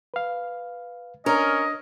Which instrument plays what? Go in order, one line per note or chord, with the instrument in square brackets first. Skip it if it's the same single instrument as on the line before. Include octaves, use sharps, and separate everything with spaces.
[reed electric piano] B4 F5
[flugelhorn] C#4 [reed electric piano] D4 [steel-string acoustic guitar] A#4 [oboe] D#5